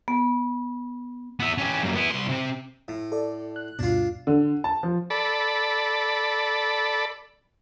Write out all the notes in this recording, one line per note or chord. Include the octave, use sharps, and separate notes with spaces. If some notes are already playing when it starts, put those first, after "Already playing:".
B3
B3 E5
C#4 G4
F#2 A#2
B3 E4
C2 C6
C3 C4
A2
A4 D5
F#6
D2 G2 B2 D4 F4
D3
A5
F3
A4 D5 B5